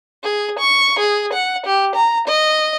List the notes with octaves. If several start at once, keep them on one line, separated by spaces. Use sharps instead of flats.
G#4
C#6
G#4
F#5
G4
A#5
D#5